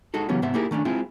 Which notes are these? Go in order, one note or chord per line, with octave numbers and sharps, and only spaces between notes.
G#3 D#4 F#4 A4
C#3 E3 F#3 B3 C#4 G4
G#2 C3 B3 C5 E5
A#3 D#4 E4 G4 G#4 A#4
D#3 A3 C#4 D4
G#3 C4 E4 F4 G#4